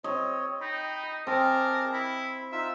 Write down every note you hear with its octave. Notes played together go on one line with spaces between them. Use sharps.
C4 C#5 D#5
D#4 G5 B5
C4 G#4 A#4 A5 D6
E4 B5
D#4 F4 E5